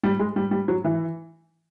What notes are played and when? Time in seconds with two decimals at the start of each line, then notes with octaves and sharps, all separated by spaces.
0.03 G3
0.19 G#3
0.36 G3
0.51 G3
0.68 F#3
0.84 E3